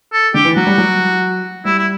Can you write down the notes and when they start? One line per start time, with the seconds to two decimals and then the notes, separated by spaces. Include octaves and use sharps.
0.13 A4
0.34 D3 G4
0.44 E3
0.56 F#3 F#4
0.67 G3
0.78 F#3
1.65 G3 E4
1.78 E4